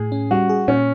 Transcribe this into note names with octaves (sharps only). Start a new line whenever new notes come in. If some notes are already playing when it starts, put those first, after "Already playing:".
Already playing: A2 G#4
C#4
G3 F#4
G#4
A#2 C#4